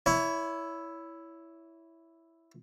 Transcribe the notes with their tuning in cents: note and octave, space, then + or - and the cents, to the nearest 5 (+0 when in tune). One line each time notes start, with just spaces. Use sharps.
E4 +0 C#5 +25